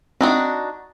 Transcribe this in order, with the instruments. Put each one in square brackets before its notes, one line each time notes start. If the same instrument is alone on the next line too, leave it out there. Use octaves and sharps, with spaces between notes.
[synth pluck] C4 [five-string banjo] D4 D#4 F#4